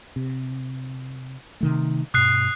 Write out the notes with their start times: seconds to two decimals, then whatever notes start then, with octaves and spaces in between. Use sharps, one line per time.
0.16 C3
1.61 C3 D#3 A3
2.14 G2 B2 D#6 F#6 C7